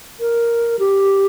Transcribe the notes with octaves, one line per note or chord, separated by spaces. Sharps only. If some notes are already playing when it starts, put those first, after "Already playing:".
A#4
G4